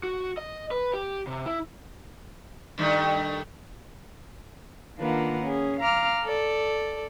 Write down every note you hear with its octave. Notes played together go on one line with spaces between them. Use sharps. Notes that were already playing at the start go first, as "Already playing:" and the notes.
F#4
D#5
B4
G4
C3
E4
G2 D#3 A3
D#3 A#3 D4 F4 B4 F#5
C#4 G#4
F5 A#5 D6 F6
A4 D5